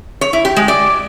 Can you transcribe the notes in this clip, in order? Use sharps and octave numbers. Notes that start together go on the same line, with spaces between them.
C#5
E4
G4
G#3
D5